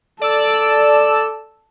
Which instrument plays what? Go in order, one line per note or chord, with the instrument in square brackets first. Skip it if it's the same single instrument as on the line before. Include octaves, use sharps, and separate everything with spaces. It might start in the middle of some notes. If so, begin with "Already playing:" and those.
[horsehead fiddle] A4 [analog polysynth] D5 E6